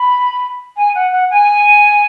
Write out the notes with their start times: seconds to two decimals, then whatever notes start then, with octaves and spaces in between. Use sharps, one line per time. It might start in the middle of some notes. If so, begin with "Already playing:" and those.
Already playing: B5
0.76 G#5
0.94 F#5
1.12 F#5
1.30 G#5